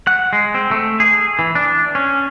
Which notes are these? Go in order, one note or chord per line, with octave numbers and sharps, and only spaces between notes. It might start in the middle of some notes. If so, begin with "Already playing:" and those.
F#5
G#3
C4
A3
G#4
E3
D4
C#4